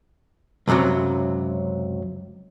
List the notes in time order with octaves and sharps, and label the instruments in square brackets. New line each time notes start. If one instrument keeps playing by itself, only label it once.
[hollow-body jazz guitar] C#2 F#2 A2 C3 F#3